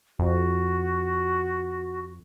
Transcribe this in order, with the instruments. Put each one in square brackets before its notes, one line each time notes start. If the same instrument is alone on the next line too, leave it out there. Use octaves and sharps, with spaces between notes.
[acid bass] F2 [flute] F#4